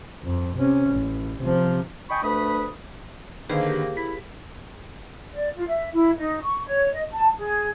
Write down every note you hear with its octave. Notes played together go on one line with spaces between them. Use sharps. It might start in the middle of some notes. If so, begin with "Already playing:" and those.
F2
C3 C#4
A1
C3 F3
D#5 G5 G#5 B5 C#6
D2 A3 D4 B4 B5 D#6
D3 D#3 A#3 G#4 B4 C5 F5
G4 A#4
E4 B6
D5
F4
E5
E4
D#4
C#6
C#5
D#5
A5
G#4